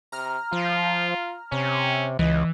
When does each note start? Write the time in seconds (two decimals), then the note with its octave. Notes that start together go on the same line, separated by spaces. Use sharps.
0.12 C3 A#5 F6
0.53 F3 F4
1.52 C3 C#4
2.19 C#2 E3 D#5